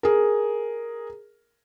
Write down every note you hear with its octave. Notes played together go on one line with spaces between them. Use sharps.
G#4 A#4